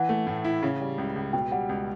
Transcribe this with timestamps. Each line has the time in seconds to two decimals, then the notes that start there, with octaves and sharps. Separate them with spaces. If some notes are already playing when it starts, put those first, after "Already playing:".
Already playing: E3 F#5
0.09 A3
0.27 A2
0.44 E4
0.63 C#3
0.81 G3
0.98 C#2
1.16 C#2
1.33 B2 G5
1.52 G3 F#5
1.69 C#2